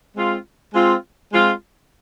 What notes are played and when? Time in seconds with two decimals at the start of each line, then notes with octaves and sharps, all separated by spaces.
0.16 G#3 C4 F4
0.74 G#3 C4 F4
1.31 G#3 C4 F4